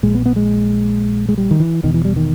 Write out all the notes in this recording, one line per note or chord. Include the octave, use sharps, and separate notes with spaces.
A#1 A#2 G#3
B3
B3
G#3
G#3
G3
D#3
E3
E1 E2 B2 D#3
E3
G3
D#3